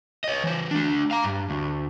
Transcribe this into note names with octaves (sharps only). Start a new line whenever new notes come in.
C#5 D#5
E3 C5
A3 D4
F5 A#5
G2
D2